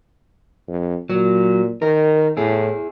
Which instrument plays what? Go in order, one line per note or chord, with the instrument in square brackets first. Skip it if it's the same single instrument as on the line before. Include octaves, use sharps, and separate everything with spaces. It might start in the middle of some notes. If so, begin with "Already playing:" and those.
[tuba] F2
[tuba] A#2 [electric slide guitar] F#3
[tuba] D#3 [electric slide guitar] A#4
[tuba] A2 [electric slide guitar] E4 G#4